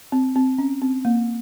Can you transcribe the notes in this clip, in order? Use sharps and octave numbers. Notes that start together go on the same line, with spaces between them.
C4
C4
C#4
C4
A#3